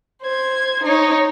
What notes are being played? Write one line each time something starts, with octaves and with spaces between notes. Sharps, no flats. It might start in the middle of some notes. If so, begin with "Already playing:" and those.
C5 G#6
D#4 C#5